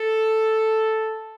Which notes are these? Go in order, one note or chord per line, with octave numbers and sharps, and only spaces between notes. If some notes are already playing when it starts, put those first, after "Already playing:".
Already playing: A4